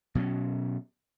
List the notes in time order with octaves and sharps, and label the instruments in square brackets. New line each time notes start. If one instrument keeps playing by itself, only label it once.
[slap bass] B2 F#3 C4 C#4